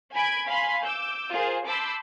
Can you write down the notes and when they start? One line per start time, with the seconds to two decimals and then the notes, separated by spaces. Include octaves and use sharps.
0.12 G#5 B5 G#6 D7
0.46 F5 G#5 B5 C6 B6
0.82 D6 E6 G6
1.31 F4 G#4 A#4 C5
1.65 A5 B5 C6 D6 E6 G6